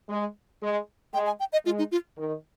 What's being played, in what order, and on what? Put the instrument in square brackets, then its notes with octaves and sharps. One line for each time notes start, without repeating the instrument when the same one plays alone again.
[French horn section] G#3
G#3
[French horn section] G#3 [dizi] G5
[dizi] G#5
G5
D#5
[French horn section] G#3 [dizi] F4
[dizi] D#4
F4
[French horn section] D#3